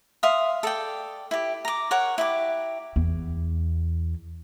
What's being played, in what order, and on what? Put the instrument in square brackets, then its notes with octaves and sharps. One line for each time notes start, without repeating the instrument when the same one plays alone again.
[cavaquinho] E5 F5 C6 D#6
A4 D5 G5
E4 G4
A#5 D6
A#4 C#5 F#5
E4 G4 D6
[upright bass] E2